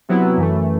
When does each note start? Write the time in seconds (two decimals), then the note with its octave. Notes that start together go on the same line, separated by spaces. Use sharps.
0.09 C3 F#3 B3 E4
0.37 F#2 E3 A3